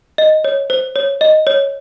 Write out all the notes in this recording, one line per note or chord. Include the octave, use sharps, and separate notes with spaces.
D#5
C#5
C5
C#5
D#5
C#5